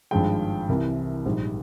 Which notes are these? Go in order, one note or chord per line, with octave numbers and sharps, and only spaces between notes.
G#1 G2 F3 G#3 G5
C2 C3 E3 A#4
A#1 G#2 G3